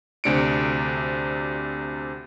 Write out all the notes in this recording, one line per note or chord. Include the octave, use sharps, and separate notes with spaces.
D2 C3 D4 C#7 D7